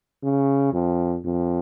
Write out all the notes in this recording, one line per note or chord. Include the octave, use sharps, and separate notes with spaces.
C#3
F2
F2